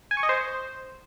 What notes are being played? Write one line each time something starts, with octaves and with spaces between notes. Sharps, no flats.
G#5
C#6
D#5
C5